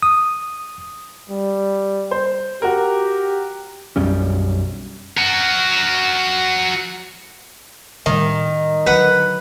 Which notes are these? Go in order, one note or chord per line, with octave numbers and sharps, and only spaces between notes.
D#6
G3
C5
F#4 G4 A#4
B1 F#2 G3 C#4
F#4 A#4
A2 D#3 G3
D3 F#3 B4 F#5